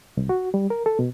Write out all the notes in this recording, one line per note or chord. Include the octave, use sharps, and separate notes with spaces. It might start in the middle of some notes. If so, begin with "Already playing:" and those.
C2
F#4
G3
A#4
A4
B2